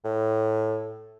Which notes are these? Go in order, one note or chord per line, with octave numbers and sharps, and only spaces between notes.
A2